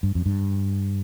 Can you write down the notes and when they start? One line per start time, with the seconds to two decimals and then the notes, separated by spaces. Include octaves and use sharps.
0.03 G2
0.15 F2
0.26 G2